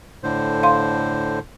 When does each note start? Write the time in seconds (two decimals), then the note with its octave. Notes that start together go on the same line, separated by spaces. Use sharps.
0.24 A2 D3 C5
0.63 F5 C6